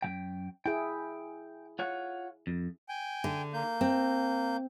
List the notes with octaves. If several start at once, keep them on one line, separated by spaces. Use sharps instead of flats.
F#2 F#3 G5
E4 G#4 G5
F4 C#5 F#5
F2
G5 G#5
D3
A#3 G6
C4